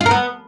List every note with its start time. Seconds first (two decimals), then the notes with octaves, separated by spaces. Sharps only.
0.01 F4
0.06 A#4
0.11 B3